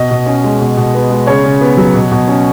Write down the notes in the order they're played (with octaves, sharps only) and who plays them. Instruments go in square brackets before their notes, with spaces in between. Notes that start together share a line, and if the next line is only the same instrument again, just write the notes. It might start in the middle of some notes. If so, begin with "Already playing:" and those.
Already playing: [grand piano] B2 D#5
B2
C#4
G#3
B2
B2
B3
G#3
C#3 C#5
C#3
B3
F#3
B2
B2
C#4